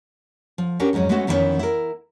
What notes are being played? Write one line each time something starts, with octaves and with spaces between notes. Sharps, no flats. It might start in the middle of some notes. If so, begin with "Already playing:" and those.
F3
C#4 D4 F#4 G4 A#4
F2 G#2 F#3 G#3 C#4
G#3 A3 B3 C#4 F#4
F2 D#3 E3 G3 B3 C#4
E4 A#4